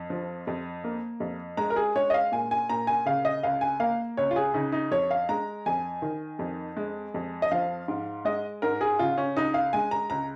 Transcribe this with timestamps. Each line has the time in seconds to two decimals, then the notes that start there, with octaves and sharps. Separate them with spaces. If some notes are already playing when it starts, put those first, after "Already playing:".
Already playing: F2
0.10 F3
0.47 F2
0.84 A#3
1.20 F2
1.57 G#3 A#5
1.70 A#4
1.76 G#4
1.96 G#3 C#5
2.10 D#5
2.14 F5
2.32 A#2 G#5
2.51 G#5
2.69 A#2 A#5
2.87 G#5
3.06 C#3 F5
3.25 D#5
3.43 C#2 F5
3.61 G#5
3.80 A#3 F5
4.17 C#2 C#5
4.31 F4
4.36 G#4
4.54 C#3 D#4
4.72 D#4
4.91 F2 C#5
5.11 F5
5.29 G#3 A#5
5.66 F2 G#5
6.02 D#3
6.39 F2
6.77 G#3
7.14 F2
7.42 D#5
7.51 F3 F5
7.88 G#2
8.25 G#3 D#5
8.62 G#2 A#4
8.81 G#4
8.99 C#3 F4
9.18 C#4
9.37 C#2 D#4
9.54 F5
9.73 G#3 G#5
9.91 A#5
10.10 C#2 A#5